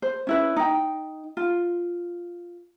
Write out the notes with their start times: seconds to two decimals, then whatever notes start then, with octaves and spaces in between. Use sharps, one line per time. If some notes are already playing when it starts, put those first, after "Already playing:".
0.02 C5
0.27 C#4 E4 B4
0.56 D#4 G5
1.37 F4